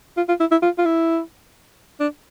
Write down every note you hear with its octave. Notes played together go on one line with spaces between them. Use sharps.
F4
F4
E4
E4
F4
F4
E4
D4